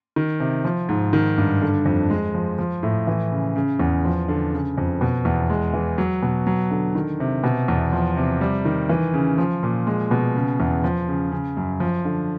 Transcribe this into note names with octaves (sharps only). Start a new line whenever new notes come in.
D#3
C3
F3
G#2
D#3
G2
D3
F2
G#3
F3
F3
A2
E3
C#3
C#3
E2
F3
D3
C#3
F2
B2
E2
G#3
E3
F#3
B2
F#3
D3
D#3
C3
B2
E2
F3
C3
G3
D#3
E3
C#3
F3
A#2
G#3
B2
C#3
E2
F3
C#3
C#3
F#2
F3
D3